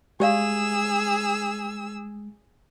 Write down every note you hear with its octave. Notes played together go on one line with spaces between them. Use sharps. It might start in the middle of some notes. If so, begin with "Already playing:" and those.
G#3 G4 G#4 D5 F5 E6